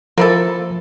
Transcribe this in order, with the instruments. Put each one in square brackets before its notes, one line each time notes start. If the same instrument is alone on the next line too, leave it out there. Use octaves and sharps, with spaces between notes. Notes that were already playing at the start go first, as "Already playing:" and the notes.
[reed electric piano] F3 C5 [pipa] A#3 E4 A4